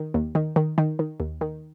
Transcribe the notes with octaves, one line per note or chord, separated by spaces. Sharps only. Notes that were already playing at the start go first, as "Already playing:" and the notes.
Already playing: D#3
D#2
D#3
D#3
D#3
D#3
D#2
D#3